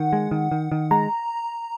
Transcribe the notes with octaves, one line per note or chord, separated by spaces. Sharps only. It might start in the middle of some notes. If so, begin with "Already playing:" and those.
Already playing: D#3 F#5
G#3
D#3
D#3
D#3
G#3 A#5